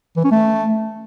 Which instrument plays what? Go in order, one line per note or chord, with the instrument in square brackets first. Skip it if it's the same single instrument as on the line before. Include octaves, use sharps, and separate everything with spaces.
[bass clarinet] E3
C#4
A3